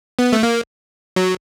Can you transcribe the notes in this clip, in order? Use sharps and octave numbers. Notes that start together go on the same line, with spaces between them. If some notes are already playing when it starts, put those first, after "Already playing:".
B3
A3
A#3
F#3